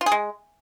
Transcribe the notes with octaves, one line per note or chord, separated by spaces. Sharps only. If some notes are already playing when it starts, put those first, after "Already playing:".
F4
G#4
G#3